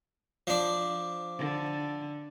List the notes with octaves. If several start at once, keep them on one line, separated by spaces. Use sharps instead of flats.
F3 D4
D3